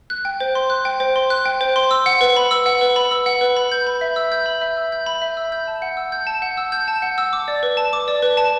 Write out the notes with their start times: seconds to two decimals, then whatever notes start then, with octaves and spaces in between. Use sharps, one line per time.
0.10 F#6
0.25 G5
0.40 C5
0.55 C6
0.70 F#6
0.85 G5
1.00 C5
1.16 C6
1.30 F#6
1.45 G5
1.61 C5
1.76 C6
1.91 E6
2.06 F#5
2.21 B4
2.36 B5
2.51 E6
2.66 F#5
2.81 B4
2.96 B5
3.11 E6
3.26 F#5
3.41 B4
3.56 B5
3.72 G6
3.87 B5
4.01 E5
4.16 E6
4.32 G6
4.46 B5
4.61 E5
4.77 E6
4.92 G6
5.06 B5
5.22 E5
5.37 E6
5.52 G6
5.67 A5
5.82 F#5
5.97 E6
6.12 G6
6.27 A5
6.42 F#5
6.57 E6
6.72 G6
6.88 A5
7.02 F#5
7.18 E6
7.33 D6
7.48 D5
7.63 B4
7.77 A5
7.93 D6
8.08 D5
8.22 B4
8.37 A5